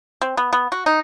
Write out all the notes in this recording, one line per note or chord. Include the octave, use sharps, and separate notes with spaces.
C4
B3
B3
F#4
D#4